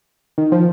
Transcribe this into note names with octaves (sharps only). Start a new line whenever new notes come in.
D#3
F3